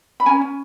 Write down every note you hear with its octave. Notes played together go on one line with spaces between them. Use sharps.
B5
C#4 G#5 A#5
C#4